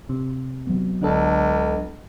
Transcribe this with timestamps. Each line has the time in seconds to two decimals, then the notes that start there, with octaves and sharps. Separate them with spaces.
0.09 C3
0.67 F#3 B3
1.01 C#2 D3 D4 A4